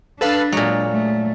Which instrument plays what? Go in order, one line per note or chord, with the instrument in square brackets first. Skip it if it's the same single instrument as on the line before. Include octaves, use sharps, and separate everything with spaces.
[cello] D4 [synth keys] A4 B4 F5
[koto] A#2 F#3 [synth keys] G#3
[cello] A3